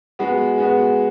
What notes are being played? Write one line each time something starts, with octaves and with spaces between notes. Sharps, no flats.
G#3 B3 F#4
G#3 B3 F#4